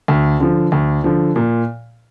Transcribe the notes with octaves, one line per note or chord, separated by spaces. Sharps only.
D2
D3 F3
D2
D3 F3
A#2